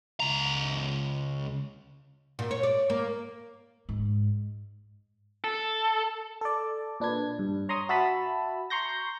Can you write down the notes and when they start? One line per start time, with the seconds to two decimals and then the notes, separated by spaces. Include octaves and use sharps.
0.20 C#2 A#5
2.39 A#2
2.51 C#5
2.63 D5
2.90 A#3
3.89 G#2
5.44 A4
6.41 A4 D5
7.00 A#2 D4 B4 G#6
7.39 G2
7.69 C#5 A#5 C6 C#6 D#6
7.89 F#4 E5 A5 B5 E6
8.70 A#5 C6 C#6 G6 A#6